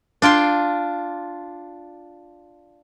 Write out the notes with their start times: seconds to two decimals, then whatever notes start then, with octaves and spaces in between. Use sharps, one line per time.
0.22 D4 F4 G5 C6